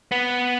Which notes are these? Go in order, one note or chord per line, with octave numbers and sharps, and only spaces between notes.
B3